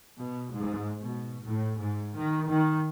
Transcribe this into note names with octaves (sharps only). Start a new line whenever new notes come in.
B2
G#2
B2
A2
G#2
D#3
D#3